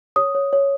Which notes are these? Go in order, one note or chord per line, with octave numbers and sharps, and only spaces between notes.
C#5 D#6
C#5
C#5